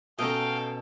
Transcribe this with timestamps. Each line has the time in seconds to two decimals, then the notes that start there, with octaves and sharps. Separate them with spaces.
0.19 B2 C#4 A4 D#5 F5 G5 A#5